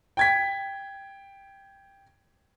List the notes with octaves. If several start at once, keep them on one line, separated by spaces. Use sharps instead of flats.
G5 G#6 B6